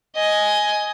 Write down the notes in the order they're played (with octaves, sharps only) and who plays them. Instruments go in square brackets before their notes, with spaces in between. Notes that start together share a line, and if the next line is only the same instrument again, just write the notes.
[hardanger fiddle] D#5 G#5